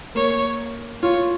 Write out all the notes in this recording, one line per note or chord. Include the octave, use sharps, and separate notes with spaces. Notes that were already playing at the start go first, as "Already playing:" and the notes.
A#3 C#5
F4 C#5